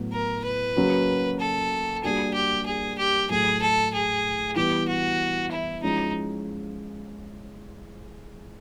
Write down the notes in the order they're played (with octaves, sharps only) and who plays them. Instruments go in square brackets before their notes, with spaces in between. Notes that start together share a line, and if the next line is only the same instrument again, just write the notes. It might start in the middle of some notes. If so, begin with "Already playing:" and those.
Already playing: [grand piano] A2 F#3 B3
[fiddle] A#4
B4
[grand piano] C#3 F#3 A#3 C#4 F#4
[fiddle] A4
[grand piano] G3 A#3 D4 F#4 A#4 [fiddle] G#4
[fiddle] G4
G#4
G4
[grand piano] A2 F#3 A3 [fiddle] G#4
[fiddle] A4
G#4
[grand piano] E3 G3 B3 [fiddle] G4
[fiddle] F#4
E4
[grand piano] F3 G#3 C#4 E4 [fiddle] D#4